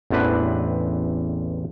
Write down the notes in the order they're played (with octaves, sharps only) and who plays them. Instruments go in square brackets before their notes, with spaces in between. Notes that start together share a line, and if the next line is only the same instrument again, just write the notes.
[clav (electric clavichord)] A1 E2 C4 D4 B4